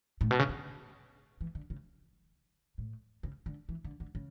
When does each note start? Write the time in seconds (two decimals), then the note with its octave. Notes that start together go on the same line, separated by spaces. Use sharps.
0.21 A2
0.31 B2
0.39 C#3
0.49 D3
1.41 E3
1.55 D3
1.70 C#3
2.78 A2
3.23 C#3
3.46 D3
3.69 E3
3.84 D3
4.00 D3
4.15 C#3